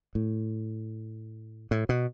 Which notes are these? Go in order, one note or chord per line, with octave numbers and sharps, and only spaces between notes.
A2
A2
B2